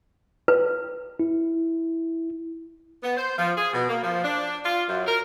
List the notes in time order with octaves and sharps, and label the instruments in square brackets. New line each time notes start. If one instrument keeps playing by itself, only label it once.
[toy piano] B4
[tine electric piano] E4
[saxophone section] B3
C5
F3
G#4
B2
A#3
F3
D4
F4
F#2
A#4